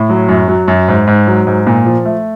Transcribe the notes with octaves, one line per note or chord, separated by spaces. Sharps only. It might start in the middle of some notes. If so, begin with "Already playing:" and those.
Already playing: A2
F#3
F#2
F#3
F#2
G#2
G#2
F#3
G#2
A#2
F3
A3